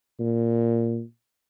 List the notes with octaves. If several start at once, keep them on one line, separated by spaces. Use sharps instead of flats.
A#2